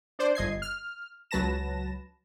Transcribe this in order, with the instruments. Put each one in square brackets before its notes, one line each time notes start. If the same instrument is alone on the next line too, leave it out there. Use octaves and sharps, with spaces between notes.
[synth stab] D4 C5 D5
G1 D#5 G#6 C7
F6
C#2 F#3 B4 A5 A#6 E7